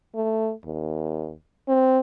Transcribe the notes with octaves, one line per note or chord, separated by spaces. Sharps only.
A3
D#2
C4